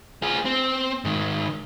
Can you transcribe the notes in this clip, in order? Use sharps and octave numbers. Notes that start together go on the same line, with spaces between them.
F4 G#4
C4
G#2 D#3